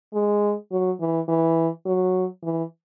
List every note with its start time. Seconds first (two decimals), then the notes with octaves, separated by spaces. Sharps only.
0.13 G#3
0.72 F#3
1.00 E3
1.28 E3
1.86 F#3
2.43 E3